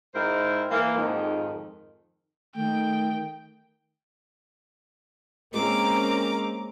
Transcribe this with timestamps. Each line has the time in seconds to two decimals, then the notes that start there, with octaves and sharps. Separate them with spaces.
0.15 G#2 C4 D#4 E4 A#4 C5
0.71 E3 A#3
0.97 F2 G#2 D#3
2.56 D#3 A3 G5
5.54 G#3 A#3 C4 C#4 A#4 A#5 D6